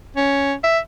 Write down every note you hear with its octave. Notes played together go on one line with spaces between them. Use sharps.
C#4
E5